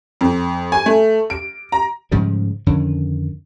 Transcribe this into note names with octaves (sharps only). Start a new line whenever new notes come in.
F2
G#5
A3
D7
A#5
G#2 C#3 F3 G3
F2 D3 D#3 C#4